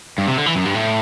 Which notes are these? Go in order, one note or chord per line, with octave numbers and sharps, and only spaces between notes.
G2
C3
D3
E3
F#2
G2
A2